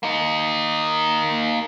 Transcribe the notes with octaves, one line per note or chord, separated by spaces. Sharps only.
A#3 D#4